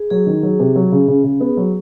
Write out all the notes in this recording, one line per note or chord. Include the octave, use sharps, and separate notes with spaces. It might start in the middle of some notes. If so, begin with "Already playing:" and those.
Already playing: G#4
F#3 G#4
D#3
F#3
C3
F#3
C#3
C#3
C#3
B3
F#3